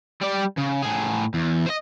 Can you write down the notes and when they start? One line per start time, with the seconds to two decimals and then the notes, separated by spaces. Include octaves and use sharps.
0.21 G3 D5
0.57 C#3
0.83 A2 G#4
1.34 E2
1.66 C5 D#5